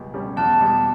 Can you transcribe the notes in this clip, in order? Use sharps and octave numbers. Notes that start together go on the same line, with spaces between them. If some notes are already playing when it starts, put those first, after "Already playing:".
Already playing: C#2 B2 G3
B2 G3 C#4
E2 A5
B2 G3